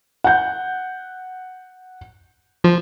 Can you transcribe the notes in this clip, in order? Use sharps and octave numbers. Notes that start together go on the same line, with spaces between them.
F#5 G6
F3